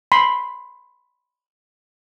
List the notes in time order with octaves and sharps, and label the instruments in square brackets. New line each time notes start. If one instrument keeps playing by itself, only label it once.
[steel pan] B5 C6